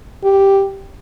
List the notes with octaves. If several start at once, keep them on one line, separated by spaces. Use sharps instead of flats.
G4